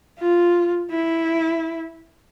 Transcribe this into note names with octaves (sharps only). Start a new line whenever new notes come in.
F4
E4